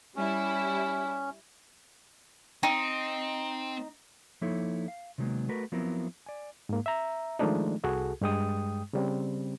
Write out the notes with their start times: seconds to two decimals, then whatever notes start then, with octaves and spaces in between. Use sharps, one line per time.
0.16 G3 C#4 E4
2.63 C4 D#4 G5
4.41 F3 A#3 D#4 E4 A4 C#5
4.88 F5
5.18 C3 D#3 F#3 G#3 A#3 B3
5.49 A3 F#4 A#4 B4
5.72 F3 F#3 B3 C4 E4 A#4
6.26 D5 G#5
6.69 G#2 A#3
6.86 E5 A#5
7.39 D#3 F3 G#3 A3 D4 D#4
7.84 C2 F#4 G#4 A4
8.21 G2 G#3 G5 D#6
8.93 C#3 G3 C4